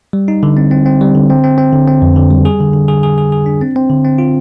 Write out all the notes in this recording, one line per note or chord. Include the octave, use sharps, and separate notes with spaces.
G3
D#4
D3
C4
C4
C4
G3
D3
C4
C4
C4
D3
C4
F2
D3
G3
G#4
D3
D3
G#4
G#4
G#4
G#4
D4
C4
C4
D3
C4
F4